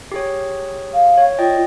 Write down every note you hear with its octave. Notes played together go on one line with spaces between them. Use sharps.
G4 G#4 C#5
F5
C#5
F4 D5 D#5 G5